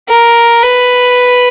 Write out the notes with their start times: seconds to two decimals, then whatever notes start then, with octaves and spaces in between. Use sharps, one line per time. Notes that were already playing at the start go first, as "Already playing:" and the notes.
0.09 A#4
0.63 B4